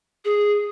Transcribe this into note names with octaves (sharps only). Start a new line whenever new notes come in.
G#4